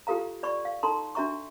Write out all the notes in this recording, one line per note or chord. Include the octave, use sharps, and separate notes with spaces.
F4 G4 A4 F5 A#5
D5 B5 C#6
F5
D#4 A4 A#5 C6
D4 F#4 E5 A#5 C#6